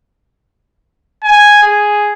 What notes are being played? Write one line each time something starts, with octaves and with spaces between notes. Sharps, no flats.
G#5
G#4